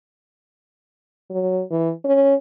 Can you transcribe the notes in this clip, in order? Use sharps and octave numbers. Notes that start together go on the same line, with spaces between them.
F#3
E3
C#4